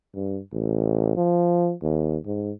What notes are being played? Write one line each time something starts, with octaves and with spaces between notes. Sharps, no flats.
G2
A1
F3
D#2
G#2